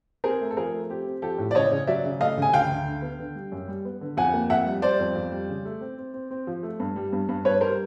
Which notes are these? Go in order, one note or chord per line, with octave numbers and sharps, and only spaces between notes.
C4 G#4 A#4
A3
A4
F3 G#4 A#4
A3
C4 G4
C4
F3 G4 A4
A2
D5
C#3 C#5 D#5
C#3
F#3 D5 E5
C#3
A3 D#5 F5
C#3 G#5
D2 F5 G5
D2
D3
B3
D3
G3
F#2
G3
B3
D3
F2 F#5 G#5
A#3
F2 E5 F#5
G3
G3 C5 D5
F2
F2
G3
C#3
A3
C4
C4
C4
C4
F3
A3
G2
G3
G2
G2
G2 B4 C#5
G3 A#4 C5